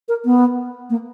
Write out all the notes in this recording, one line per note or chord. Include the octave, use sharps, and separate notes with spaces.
A#4
B3
A#3